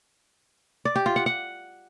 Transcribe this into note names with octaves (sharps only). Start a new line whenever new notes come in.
D5
G4
F4
F#5
F#5